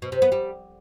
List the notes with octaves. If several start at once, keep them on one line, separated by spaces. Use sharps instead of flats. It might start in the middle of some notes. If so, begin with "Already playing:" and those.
B2
C3
B3
G3